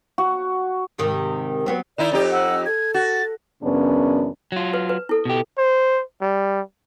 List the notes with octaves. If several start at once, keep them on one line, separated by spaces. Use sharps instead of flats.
F#4
G#2 C3 D#3
F#3 B3 C4
D#3 D#4 E4 D5
F2 D#4 G4
F#5 E6
A4 G#6
F#4 A6
F#2 C#3 E3 B3 C#4 D4
F#3 F4
B4
B4
E4 A4
B2 G4
C5
G3